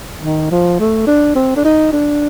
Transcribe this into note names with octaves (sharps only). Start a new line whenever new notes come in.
D#3
F3
A3
D4
C4
D4
D#4
D4